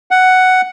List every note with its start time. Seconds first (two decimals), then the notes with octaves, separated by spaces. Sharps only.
0.11 F#5